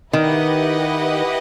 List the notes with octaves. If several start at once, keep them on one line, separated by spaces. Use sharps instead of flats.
D#3 E4 G4 B4 D#5 F#5